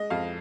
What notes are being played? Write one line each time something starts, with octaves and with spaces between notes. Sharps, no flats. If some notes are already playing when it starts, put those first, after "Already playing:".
Already playing: G#3 D#5
F2 F5